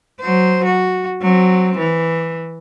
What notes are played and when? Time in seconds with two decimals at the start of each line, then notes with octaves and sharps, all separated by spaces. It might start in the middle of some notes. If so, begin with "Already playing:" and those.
0.20 F#3 C5
0.65 F#4
1.21 F#3 C4
1.78 E3